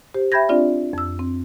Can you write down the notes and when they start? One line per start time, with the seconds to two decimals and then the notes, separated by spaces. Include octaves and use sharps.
0.15 G4 C5
0.32 E5 G5 B5 G6 G#6 A#6
0.49 C4 D4 F4 D5
0.93 F2 E6
1.19 C4